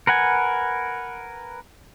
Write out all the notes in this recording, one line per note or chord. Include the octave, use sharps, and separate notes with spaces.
A#4 B4 F#5 G#5